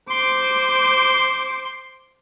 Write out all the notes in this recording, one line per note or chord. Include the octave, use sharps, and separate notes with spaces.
C5 C6 D6